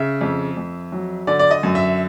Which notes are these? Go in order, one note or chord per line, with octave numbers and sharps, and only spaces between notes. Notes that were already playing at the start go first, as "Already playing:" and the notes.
Already playing: C#3 E5
F2
F2
F#3
D3 D5
D5
D#5
F#2
E5